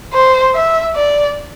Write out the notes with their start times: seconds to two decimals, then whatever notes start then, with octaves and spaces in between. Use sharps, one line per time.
0.13 C5
0.54 E5
0.95 D5